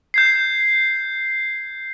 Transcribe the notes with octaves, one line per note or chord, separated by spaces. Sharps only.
G6 G#6 C7